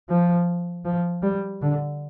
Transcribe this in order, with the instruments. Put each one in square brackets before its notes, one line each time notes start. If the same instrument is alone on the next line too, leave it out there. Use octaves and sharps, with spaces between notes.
[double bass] F3
F3
G3
D3